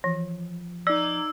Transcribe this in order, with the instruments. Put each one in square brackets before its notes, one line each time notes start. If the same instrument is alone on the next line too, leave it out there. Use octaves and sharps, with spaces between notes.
[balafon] E3 [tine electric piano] F3
[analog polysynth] D#4 D6 G#6 [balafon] D5 [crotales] E6